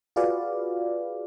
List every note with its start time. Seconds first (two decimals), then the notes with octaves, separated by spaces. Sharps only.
0.16 F4 F#4 G#4 B4 D5 F5